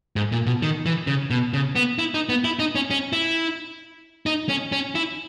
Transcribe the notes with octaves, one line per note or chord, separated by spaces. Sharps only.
G#2
A#2
B2
D#3
E3
C#3
B2
C#3
B3
E4
D#4
B3
E4
D#4
C#4
C#4
E4
D#4
C#4
C#4
E4